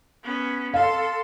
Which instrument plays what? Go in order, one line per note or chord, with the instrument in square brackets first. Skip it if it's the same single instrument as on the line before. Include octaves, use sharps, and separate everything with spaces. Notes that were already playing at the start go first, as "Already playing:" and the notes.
[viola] B3 C#4
[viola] A4 C6 [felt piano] F5